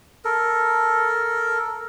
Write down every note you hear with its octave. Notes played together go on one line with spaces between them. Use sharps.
A4 A#4